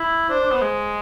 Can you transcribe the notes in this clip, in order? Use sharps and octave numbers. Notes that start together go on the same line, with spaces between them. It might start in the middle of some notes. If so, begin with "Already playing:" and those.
Already playing: E4
D4 C5
D4
B3
G#3